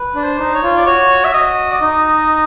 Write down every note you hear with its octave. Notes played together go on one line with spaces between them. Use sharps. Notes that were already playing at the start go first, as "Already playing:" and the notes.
Already playing: B4
D4
C5
D#4
C#5
F4
D5
F#4 C#5
E5
F#4 D#5
D5
D#4 D#5